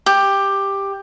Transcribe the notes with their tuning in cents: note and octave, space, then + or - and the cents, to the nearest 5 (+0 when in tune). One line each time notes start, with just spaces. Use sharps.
G4 +10